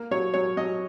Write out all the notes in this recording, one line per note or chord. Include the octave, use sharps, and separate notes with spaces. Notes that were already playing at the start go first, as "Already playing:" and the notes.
Already playing: A#3
F#3 C#5
F#3 C#5
F#3 D#5